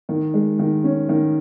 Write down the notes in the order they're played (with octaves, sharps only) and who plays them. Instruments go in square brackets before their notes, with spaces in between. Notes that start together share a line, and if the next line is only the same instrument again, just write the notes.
[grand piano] D#3
G#3
D#3
C#4
D#3